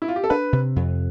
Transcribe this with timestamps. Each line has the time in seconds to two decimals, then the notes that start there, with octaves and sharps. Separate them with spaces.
0.02 E4
0.08 F4
0.16 G4
0.24 A4
0.30 D4 B4
0.53 C3
0.76 F2